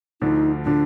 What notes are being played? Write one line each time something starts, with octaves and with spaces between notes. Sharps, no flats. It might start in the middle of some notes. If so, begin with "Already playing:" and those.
D2 D3 F3 D#4
D3 F3 D4